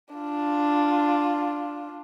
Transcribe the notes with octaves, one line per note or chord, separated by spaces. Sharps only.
D4 F4